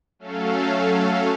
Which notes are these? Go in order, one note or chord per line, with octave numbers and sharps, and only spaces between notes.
F#3 A3 C#4 A4 F5